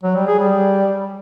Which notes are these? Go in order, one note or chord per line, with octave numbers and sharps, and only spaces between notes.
F#3
G3
G#4
G3